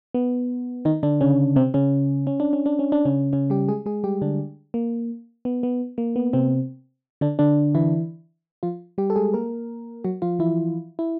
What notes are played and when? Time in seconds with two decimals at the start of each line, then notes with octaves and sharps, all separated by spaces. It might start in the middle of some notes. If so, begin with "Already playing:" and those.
0.14 B3
0.85 D#3 D#4
1.03 D3 D4
1.21 C#3 C#4
1.56 C3 C4
1.74 C#3 C#4
2.27 C#4
2.40 D4
2.53 C#4
2.66 D4
2.79 C#4
2.92 D4
3.05 C#3 C#4
3.33 C#3 C#4
3.50 G3 G4
3.68 G#3 G#4
3.86 G#3 G#4
4.04 G3 G4
4.22 D3 D4
4.74 A#3
5.45 B3
5.63 B3
5.98 A#3
6.16 B3
6.33 C3 C4
7.21 D3 D4
7.39 D3 D4
7.75 E3 E4
8.63 F3 F4
8.98 G3 G4
9.10 A4
9.16 G#3 G#4
9.34 A#3 A#4
10.04 F#3 F#4
10.22 F3 F4
10.39 E3 E4
10.99 E4